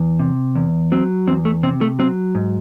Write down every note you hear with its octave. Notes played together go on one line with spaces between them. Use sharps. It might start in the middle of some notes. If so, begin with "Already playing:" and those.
Already playing: E2
C3
E2
F#3 C4
E2 C4
A3
C3 C4
A3
F#3 C4
G#2